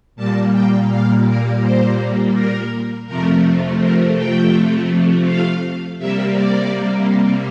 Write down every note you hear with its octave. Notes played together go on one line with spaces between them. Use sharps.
A#2 G3 A#3 A5
G5
F5
A#4
C5
A#4
F2 C3 F3 A3 A#4
A#4
G5
F5
C3 G3 A#3 E5
D5